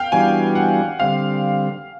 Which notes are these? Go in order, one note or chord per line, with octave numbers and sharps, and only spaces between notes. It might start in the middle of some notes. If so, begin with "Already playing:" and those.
Already playing: F5 G5
E3 G3 B3 D4 F#4 G#5
F#5
D3 G3 C4 F5